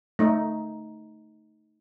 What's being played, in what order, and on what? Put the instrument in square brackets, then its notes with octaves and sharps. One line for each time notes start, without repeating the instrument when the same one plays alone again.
[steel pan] A3 D#4